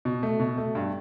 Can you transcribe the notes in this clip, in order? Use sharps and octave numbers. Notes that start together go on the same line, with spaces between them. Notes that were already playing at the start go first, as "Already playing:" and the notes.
B2
A3
B2
A3
G2